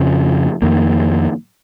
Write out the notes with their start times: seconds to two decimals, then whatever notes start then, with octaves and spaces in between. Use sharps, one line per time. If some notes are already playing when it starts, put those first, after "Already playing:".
Already playing: F2 C#3 F3
0.62 F2 D#3 A#3